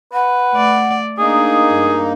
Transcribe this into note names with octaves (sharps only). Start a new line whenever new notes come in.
B4 F#5
A3 D5
A#3 D4 D#4 G#4 D#6
G2